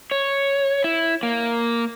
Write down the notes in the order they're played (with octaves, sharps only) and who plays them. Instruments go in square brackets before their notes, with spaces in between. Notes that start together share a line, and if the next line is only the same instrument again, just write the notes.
[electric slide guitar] C#5
E4
A#3